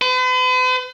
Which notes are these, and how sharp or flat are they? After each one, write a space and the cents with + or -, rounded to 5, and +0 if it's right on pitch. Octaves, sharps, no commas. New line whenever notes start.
B4 +45